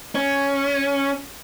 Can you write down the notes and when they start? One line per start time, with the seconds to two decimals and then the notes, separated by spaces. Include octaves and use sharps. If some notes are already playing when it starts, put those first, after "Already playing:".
0.15 C#4